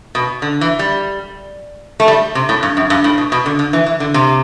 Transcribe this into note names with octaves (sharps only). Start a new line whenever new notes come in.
B2
D3
E3
G3
A3
G3
C3
A2
G2
F#2
G2
A2
B2
B2
D3
D3
E3
E3
D3
C3